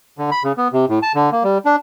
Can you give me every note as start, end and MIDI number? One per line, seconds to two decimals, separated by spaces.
0.18 0.30 50
0.31 0.43 83
0.44 0.52 49
0.57 0.68 59
0.73 0.85 48
0.89 0.99 45
1.02 1.12 81
1.15 1.30 50
1.32 1.43 58
1.43 1.58 55
1.65 1.76 62